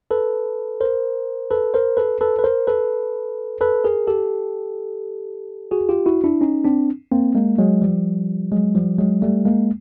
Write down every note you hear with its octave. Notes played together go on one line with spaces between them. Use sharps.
A4 B4
A#4 C5
A4 B4
A#4 C5
A4 B4
A4 B4
B4
A#4 C5
A4 B4
A4 B4
G#4 A#4
G4 A4
F#4 G#4
F4 G4
E4 F#4
D4 E4
C#4 D#4
C4 D4
A#3 C4
G#3 A#3
F#3 G#3
F3 G3
F#3 G#3
F3 G3
F#3 G#3
G3 A3
G#3 A#3